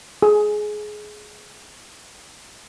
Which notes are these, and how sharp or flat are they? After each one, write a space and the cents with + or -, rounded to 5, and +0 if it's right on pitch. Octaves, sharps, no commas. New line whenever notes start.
G#4 +20